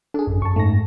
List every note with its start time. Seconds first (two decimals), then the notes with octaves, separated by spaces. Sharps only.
0.14 D4 G#4 A4
0.27 G#1 F#2
0.42 F#2 A5 C#6
0.56 G#2 A3 A#6